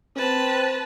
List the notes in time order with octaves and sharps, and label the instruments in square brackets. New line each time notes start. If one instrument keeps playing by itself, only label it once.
[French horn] C4 [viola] B4 A5